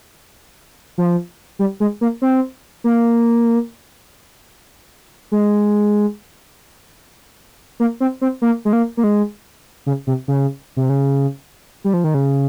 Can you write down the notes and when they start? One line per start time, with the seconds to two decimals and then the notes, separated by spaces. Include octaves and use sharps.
0.98 F3
1.59 G3
1.80 G#3
2.01 A#3
2.22 C4
2.84 A#3
5.32 G#3
7.80 A#3
8.00 C4
8.21 C4
8.42 A#3
8.65 G#3
8.73 A#3
8.97 A#3
9.04 G#3
9.86 C#3
10.07 C3
10.28 C#3
10.77 C3
10.89 C#3
11.84 G3
11.94 F3
12.04 D#3
12.14 C#3